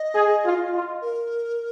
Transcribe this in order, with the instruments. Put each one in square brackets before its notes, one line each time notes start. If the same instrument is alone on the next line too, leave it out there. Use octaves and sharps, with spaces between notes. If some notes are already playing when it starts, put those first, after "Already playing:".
Already playing: [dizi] D#5
[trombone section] G#4
F4
F4
[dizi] A#4